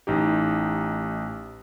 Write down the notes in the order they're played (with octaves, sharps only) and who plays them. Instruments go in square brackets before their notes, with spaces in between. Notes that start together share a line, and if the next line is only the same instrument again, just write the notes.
[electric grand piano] A1 D#4 G4